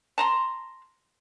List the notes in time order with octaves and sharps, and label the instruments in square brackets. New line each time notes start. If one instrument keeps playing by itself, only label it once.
[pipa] A5 A#5 C6